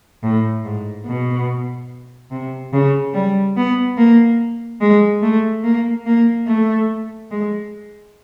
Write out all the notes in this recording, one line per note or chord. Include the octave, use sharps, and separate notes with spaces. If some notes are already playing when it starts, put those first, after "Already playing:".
A2
G#2
B2
C3
C#3
G3
B3
A#3
G#3
A3
A#3
A#3
A3
G#3